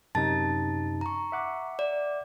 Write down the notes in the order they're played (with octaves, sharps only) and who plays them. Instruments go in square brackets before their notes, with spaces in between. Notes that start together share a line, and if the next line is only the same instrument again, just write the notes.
[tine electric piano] F#2 C3 D#4 [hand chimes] A5 A6
[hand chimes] A#5 C#6
[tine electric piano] E5 F#5 D6
[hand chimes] D5